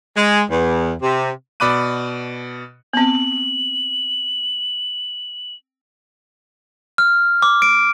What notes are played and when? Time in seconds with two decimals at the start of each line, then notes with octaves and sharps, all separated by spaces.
0.17 G#3
0.50 E2
1.02 C3
1.60 B2 D5 B5 D6 F#6 D#7
2.93 B3 C4 F#7
6.98 F6
7.42 D6
7.62 D7